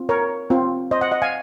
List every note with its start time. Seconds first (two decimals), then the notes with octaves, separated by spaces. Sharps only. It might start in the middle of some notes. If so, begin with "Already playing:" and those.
Already playing: C4 F4
0.09 A#4 C#5
0.50 C4 F4
0.91 C5 D#5
1.01 D#5 F#5
1.11 D#5 F#5
1.22 F5 G#5